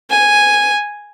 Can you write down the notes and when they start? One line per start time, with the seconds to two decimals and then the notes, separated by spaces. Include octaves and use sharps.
0.10 G#5